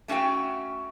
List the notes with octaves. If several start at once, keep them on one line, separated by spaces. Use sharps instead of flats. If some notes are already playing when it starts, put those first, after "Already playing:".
A3 C#4 F#4 F5 G5